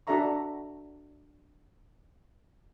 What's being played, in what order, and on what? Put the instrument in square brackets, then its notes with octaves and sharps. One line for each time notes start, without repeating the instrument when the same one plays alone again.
[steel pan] D4 F#4 A4 E5 A#5 C#6